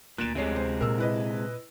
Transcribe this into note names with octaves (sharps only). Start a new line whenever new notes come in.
D2 A#2 B3 F#6 D7 E7
F1 C3 G#3 C#5 C7
C5
A#2 A#4 E6
E4 B4 D#5